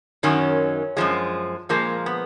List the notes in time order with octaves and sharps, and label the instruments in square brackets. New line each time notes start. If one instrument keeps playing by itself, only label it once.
[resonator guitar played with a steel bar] F#2 D#3 F#3 C#4
F#2 F3 G#3
A#2 F3 G#3 A#3
B3